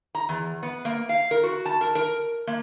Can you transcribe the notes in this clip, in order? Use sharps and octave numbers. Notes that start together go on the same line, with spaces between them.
A#5
E2
B3
A#3
F5
A#4
F#4
A5
A#4
A#4
A#3